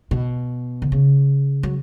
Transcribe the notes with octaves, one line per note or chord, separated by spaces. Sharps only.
B2
D3
C#3
F#3